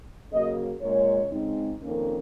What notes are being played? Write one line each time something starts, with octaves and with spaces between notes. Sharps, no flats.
C#3 F#3 A#3 D#5
A#2 G#3 C#4 C#5
C#3 G#3 C4 D#4
F2 D#3 A#3 C#4